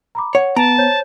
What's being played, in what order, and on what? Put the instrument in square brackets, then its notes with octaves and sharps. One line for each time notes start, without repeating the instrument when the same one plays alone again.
[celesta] A#5 B5 D6
[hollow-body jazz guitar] C#5 [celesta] F#5
[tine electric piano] B3 [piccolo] A5 [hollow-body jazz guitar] A#5 [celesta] D7
[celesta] C5 C#5 G6